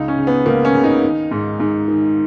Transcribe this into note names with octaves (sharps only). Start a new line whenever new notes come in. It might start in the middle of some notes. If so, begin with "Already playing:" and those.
Already playing: C#2 D#4
C#4
C#3
B3
C#2 A#3
C#4
C#3
D#4
D#3
G#2
G#2
D#3